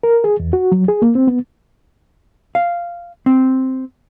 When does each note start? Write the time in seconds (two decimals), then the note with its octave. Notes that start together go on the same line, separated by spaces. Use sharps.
0.03 A#4
0.24 G#4
0.40 E2
0.53 F#4
0.72 F#3
0.88 G#4
1.02 A#3
1.15 C4
1.27 B3
2.55 F5
3.26 C4